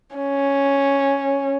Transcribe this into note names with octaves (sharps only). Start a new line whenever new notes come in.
C#4